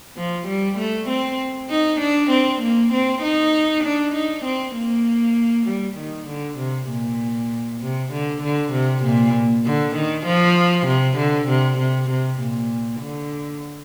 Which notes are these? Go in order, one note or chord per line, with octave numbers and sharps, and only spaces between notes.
F3
G3
A3
C4
D#4
D4
C4
A#3
C4
D#4
D4
D#4
C4
A#3
G3
D#3
D3
C3
A#2
C3
D3
D3
C3
A#2
D3
D#3
F3
C3
D3
C3
C3
C3
A#2
D3